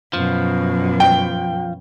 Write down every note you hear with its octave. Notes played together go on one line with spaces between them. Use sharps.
F#2 B2 F3
G5